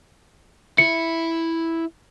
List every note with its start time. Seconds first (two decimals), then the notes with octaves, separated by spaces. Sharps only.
0.78 E4 C#7